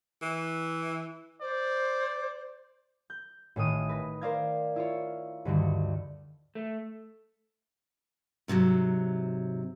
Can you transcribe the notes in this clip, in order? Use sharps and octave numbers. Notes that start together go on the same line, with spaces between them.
E3
C5 D5
G6
A1 A2 D#3 D#6 D#7
B4 A#6
A#4 C5 D5 F5 A#5 G#6
E4 F4 C#5
D2 G2 D3 D#3
A3
G#2 C3 D#3 F#3